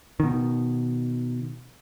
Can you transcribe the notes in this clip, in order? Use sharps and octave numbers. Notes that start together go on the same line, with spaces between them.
B2 D#3